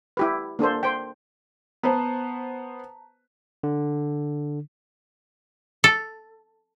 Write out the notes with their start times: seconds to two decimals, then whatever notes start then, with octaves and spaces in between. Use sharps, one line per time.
0.17 E4 G4 B4
0.59 A#3 D4 A4 C5
0.83 C5 G5
1.83 B3 B4 C5 A5 A#5
3.63 D3
5.84 A4